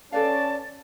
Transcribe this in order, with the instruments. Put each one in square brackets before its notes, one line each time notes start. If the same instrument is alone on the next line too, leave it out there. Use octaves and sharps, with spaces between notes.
[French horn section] C#4 [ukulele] A4 B4 F5 [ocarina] D5 [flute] A5